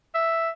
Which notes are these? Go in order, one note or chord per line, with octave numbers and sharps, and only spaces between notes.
E5